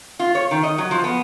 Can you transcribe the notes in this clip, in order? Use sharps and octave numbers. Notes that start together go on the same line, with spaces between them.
F4
C#5
D#3
D#5
F#3
F3
B3